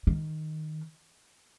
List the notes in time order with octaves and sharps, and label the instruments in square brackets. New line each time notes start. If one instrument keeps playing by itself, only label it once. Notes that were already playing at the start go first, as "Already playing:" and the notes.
[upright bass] D#3